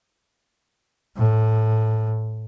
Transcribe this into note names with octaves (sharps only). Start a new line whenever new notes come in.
A2